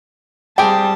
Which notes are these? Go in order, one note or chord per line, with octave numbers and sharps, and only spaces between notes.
G3 C4 G4 G#4 G5 A5